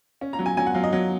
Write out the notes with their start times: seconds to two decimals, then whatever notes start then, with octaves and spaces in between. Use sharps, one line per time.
0.21 C#4
0.33 A#5
0.39 F#3
0.46 G#5
0.57 F#3 G#5
0.66 F#5
0.74 F#3 F5
0.84 D#5
0.93 F#3